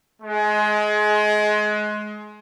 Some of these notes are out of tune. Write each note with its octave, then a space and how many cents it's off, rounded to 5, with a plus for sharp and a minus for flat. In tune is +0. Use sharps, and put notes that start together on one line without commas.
G#3 +25